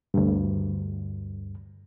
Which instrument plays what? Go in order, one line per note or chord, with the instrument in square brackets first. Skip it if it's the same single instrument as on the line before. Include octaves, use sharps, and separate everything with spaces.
[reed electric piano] D2 G2